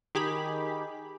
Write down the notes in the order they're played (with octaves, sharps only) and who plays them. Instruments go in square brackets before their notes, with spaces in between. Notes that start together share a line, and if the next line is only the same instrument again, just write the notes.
[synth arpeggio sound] D#3 G4 G#4 B5